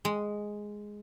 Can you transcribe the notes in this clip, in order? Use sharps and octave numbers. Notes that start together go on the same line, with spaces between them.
G#3